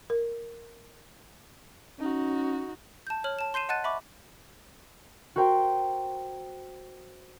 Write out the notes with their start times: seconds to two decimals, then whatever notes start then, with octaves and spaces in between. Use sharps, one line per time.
0.10 A#4
2.00 C#4 D#4 F#4
3.07 A5 G6
3.24 C#5 F6 F#7
3.39 A5 E7
3.54 C6 G6 C7 D#7 E7
3.69 D#5 F#5 A5 F#6 A6 D#7
3.84 E5 B5 C#6 D6
5.36 F#4 A#4 C5 G5